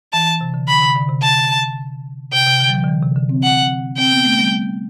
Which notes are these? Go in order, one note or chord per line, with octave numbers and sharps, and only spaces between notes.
E3 A5
C3
D3
D3 B5
C3
D3
C3
A5
C3 G5
C3
D3
F#3
E3
D3
E3
C3
D3
C4
F#5
C4 G5
B3
A3
G3